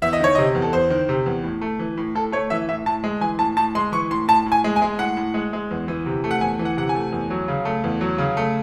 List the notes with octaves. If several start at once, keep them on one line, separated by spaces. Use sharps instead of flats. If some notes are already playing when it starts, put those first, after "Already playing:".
E2 E5
D#5
D#3 C#5
C3 D#5
E2
A4
E2 C5
D#3
C3
E2
A2
A3
E3
A2
A2 A4
A3 C#5
E3 E5
A2 E5
A2 A5
G#3
E3 G#5
A2 A5
A2 A5
G#3 C6
E3 C#6
A2 C6
A2 A5
A2
G#5
G#3
G#5
G#3
A2 F#5
A2
G#3
G#3
E2
E3
C3
A3
F#5
E2 G#5
E3
F#5
C3 F#5
G#5
A3
E2
F#3
C#3
A3
E2
F#3
C#3
A3